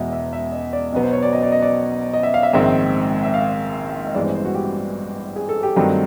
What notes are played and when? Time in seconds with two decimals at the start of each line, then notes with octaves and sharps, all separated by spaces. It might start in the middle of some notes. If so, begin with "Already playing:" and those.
Already playing: E1 E2 B2 G#3 D#5 E5
0.12 E5
0.33 E5
0.52 D#5
0.73 D5
0.92 B1 B2 F#3 B3
1.03 C5
1.13 C#5
1.23 D5
1.33 D#5
1.43 D5
1.52 D#5
1.62 D5
2.14 D#5
2.23 E5
2.34 F5
2.43 E5
2.53 A#1 G#2 D#3 G#3 C4 E5
3.23 E5
3.34 F5
4.06 D#5
4.14 A1 G2 E3 G#3 B3 D5
4.25 C5
4.35 C5
4.45 F#4
4.55 G4
5.36 G#4
5.49 A4
5.63 G4
5.76 G2 D#3 F#3 A3 C4